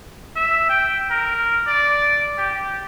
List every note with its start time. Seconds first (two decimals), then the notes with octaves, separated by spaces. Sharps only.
0.36 E5
0.69 G5
1.11 A#4
1.67 D5
2.38 G4